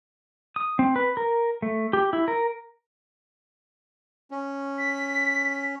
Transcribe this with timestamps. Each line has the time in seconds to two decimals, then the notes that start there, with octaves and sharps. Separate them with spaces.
0.56 D#6
0.79 C4
0.96 B4
1.17 A#4
1.62 A3
1.93 G4
2.13 E4
2.28 A#4
4.31 C#4
4.78 B6